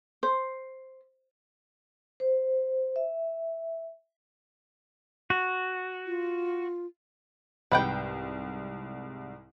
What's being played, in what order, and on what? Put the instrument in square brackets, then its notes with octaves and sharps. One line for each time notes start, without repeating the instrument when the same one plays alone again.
[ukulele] C5
[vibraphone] C5
E5
[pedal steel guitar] F#4
[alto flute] F4
[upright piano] C2 G#2 [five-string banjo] B4 F#5 G5